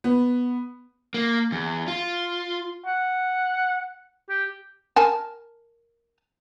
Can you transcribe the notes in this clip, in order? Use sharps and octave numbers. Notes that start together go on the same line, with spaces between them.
B3
A#3
E2
F4
F#5
G4
A#4 G#5 A5